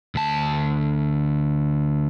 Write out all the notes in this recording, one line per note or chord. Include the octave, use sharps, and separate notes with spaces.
D2 A5